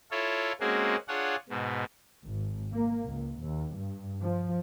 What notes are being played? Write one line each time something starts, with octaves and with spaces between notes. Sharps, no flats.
E4 F4 A4 C#5
G#3 A#3 C4 C#4 F#4 G#4
D4 F4 G#4 C#5 F#5
G#2 B2
G#1
A#3
C#2
D#2
G2
F3